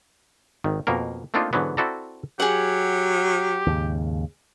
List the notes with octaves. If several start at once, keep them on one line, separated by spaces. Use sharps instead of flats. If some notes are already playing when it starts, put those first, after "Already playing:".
G#1 D#3
F2 B2 A#3 A#4
A3 A#3 C4 D4 D#4 F4
G#2 D3 E3 F#3 B3
C4 E4 F#4 A4 D5 A#5
F#3 G4 G#4 F#5
D#2 G#2 C#3